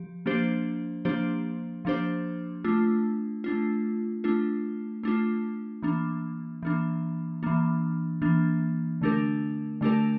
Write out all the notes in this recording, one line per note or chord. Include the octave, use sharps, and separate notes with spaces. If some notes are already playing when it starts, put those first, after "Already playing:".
Already playing: F3 G4
F3 A#3 D4 G4 C5
F3 A#3 D4 G4 C5
F3 A#3 D4 G4 C5
A3 D4 F4
A3 D4 F4
A3 D4 F4
A3 D4 F4
E3 A#3 D4
E3 A#3 D4
E3 A#3 D4
E3 A#3 D4
D3 A3 D4 G4 A#4
D3 A3 D4 G4 A#4